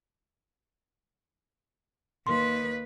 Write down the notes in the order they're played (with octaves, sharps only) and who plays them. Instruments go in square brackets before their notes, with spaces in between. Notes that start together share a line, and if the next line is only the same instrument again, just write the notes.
[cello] D#2 B4 [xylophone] C6